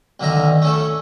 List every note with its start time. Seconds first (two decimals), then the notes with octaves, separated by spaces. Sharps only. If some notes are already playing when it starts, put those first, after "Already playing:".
0.20 B1 D3 D#3 E5 A#5
0.62 A3 C#4 A4